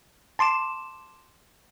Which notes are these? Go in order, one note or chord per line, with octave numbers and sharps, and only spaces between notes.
A5 C6 D6 E7